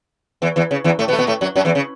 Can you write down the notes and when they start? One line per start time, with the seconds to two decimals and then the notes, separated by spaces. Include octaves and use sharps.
0.42 E2 E3
0.56 E2 E3
0.71 C#3
0.84 E2 E3
0.99 A2 A3
1.08 B2 B3
1.13 A3
1.19 B2 B3
1.27 A2 A3
1.41 F#2 F#3
1.56 F#2 F#3
1.65 E2 E3
1.75 C#3